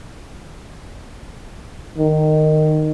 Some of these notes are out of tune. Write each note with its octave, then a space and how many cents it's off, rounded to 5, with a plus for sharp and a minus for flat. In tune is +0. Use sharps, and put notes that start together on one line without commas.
D#3 -15